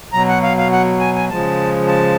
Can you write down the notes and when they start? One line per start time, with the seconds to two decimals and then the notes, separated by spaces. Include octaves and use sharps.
0.13 B2 F#3 A#5
0.29 F#5
0.43 F5
0.57 F5
0.72 F#5
1.00 G#5
1.15 G#5
1.29 C#3 F3 G#3 A5
1.88 A5